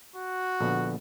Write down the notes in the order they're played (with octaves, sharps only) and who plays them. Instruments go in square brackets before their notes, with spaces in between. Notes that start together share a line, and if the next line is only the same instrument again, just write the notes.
[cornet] F#4
[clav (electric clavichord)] A#1 D3 B3